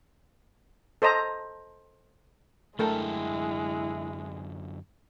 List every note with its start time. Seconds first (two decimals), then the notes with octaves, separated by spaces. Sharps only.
1.02 A4 C5 D#5 A#5
2.79 F#2 D3 G#3 A3 E4 A4 A#4 G5